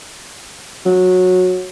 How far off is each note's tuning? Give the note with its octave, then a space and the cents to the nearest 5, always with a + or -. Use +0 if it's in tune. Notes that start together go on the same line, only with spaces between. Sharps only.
F#3 -15